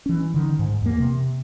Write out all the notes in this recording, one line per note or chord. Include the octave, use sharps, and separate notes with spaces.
E3 C#4
D3 D#3
G#2
E2 A#3
C3